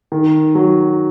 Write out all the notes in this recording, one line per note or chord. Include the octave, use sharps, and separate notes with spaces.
D#3
F#3